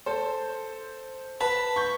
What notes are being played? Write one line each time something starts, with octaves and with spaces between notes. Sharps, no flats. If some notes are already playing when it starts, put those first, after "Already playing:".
A4 C5
B4 A5
C#6 G6